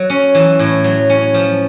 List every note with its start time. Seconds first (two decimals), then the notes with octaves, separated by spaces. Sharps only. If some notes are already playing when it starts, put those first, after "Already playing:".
Already playing: F#3
0.10 C#4
0.35 E3
0.59 A2
0.84 F#3
1.10 C#4
1.34 F3